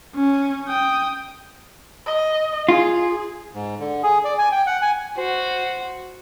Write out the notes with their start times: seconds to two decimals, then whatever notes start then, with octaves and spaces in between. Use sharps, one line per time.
0.16 C#4
0.69 G5 D#6
2.06 D#5
2.69 F4 G#4
3.54 G#2
3.79 D3
4.03 G#4
4.24 D5
4.39 G#5
4.52 G5
4.67 F#5
4.82 G#5
5.18 F#4 C5